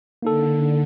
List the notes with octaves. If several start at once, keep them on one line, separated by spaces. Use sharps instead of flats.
D3 A#3 D#4 A4